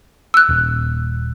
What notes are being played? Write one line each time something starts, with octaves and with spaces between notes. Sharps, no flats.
E6 F#6
D#1